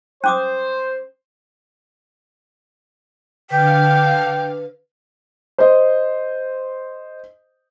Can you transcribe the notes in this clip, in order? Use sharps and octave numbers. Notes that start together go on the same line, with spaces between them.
C#4 C5 D6 D#6
D3 B4 F5 G5
C5 D#5